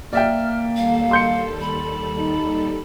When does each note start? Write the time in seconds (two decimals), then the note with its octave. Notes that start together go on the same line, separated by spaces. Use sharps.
0.13 A#3 D5 E5 G5 F6
0.76 D#2 G3 A4 F5
1.11 C6 G6 C#7
1.61 B5
2.16 D#4